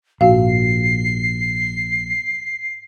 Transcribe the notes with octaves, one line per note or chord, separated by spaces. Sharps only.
A#1 G#2 F#4 F5 C7